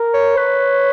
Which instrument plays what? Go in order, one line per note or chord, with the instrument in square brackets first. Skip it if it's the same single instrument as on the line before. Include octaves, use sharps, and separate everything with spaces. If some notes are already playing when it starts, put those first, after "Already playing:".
Already playing: [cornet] A#4
[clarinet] C#5
[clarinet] B4 [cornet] C#5